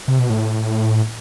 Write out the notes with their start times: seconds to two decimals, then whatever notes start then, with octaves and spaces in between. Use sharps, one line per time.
0.08 C3
0.19 B2
0.30 A2